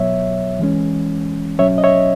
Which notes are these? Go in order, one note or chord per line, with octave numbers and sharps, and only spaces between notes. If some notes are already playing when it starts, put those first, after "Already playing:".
Already playing: B2 F#3 B3 C#5 E5
E3 G#3 C#4
B2 F#3 C#4 C#5 E5
D#5
C#5 E5